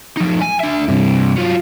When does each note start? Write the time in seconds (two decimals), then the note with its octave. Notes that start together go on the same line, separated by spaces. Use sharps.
0.17 F3 D#4
0.41 G#5
0.60 D4 E5
0.88 G2 C3
1.36 F#3 F4